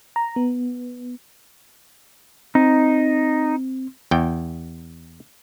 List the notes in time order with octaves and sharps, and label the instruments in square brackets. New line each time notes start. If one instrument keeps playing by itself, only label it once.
[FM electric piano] A#5
B3
[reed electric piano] C4 [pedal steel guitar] D#4
[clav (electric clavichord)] E2 G5